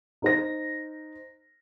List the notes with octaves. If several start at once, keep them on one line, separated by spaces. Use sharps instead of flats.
D#4 C5 A#6